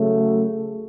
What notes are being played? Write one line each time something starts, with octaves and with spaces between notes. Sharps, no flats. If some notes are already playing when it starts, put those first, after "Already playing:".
Already playing: C#3 F#3 A3